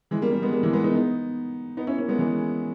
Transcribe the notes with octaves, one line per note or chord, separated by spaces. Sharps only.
E3 G#3
G3 A#3
G3 A#3
G#3 B3
G3 A#3
E3 G#3
G#3 B3
B3 D#4
B3 D#4
B3 D#4
C#4 E4
A#3 C#4
G#3 B3
E3 G#3